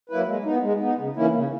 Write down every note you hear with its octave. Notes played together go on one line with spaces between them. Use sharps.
F#3 A#3 E4 B4
G#3
B3 D#4
G#3
B3 D#4
C#3
E3 A#3 C#4 E4
C#3